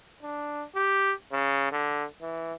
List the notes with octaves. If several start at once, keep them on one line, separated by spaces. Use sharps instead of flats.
D4
G4
C#3
D3
E3